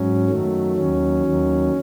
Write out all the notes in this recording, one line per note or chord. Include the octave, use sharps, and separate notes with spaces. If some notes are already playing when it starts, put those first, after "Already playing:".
Already playing: G#2 F#3 C#4
F#2 D#3 F#3 A3
D#2 D#3 F#3 C#4
D#2 D#3 F#3